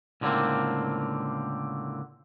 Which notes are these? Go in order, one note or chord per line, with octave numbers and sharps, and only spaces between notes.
C#2 A2 D3 A3 A#3 C4